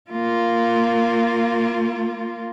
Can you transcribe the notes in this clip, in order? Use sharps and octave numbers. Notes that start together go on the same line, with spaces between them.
A#3 F4